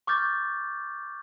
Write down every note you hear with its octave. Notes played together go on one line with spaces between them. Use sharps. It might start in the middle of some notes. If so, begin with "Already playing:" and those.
C#6 D6 F6 G6 A6